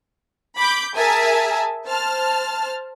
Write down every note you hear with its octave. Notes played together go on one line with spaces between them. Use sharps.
B5 D6 G6
G#4 A#4 E5 G#5 A5
C5 A5 F6